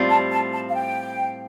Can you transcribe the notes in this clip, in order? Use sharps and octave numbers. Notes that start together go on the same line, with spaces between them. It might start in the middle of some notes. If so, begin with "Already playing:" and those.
Already playing: A2 G3 C4 F4
A5
A5
A5
F5
G5